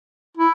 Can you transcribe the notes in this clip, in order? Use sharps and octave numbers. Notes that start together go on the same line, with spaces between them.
E4